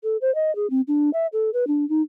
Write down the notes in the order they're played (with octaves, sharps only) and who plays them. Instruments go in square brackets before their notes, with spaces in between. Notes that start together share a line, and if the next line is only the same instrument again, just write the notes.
[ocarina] A4
C5
D#5
G#4
C4
D4
E5
A4
B4
D4
D#4